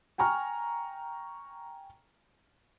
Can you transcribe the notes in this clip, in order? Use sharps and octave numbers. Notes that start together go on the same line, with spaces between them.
G5 G#5 A#5 C#6 F6